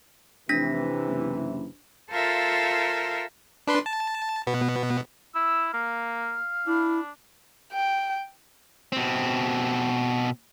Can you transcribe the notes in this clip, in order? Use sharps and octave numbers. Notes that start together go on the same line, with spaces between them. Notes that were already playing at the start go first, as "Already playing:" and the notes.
F1 C3 E3 D4 A#6 B6
F#1
F4 A4 A#4 C5 E5 F5
D4 B4 C6
A5
B2 B3
E4 E6
A#3 F5
D4 E4
G5
B2 C4